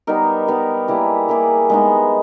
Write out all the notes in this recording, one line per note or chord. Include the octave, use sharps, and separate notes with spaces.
G3 B3 D#4 A#4
G3 B3 D#4 A#4
G3 A#3 E4 G#4
G3 A#3 E4 G#4
G#3 B3 D#4